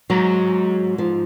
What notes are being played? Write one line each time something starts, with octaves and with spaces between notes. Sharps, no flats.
G#2 F#3
F3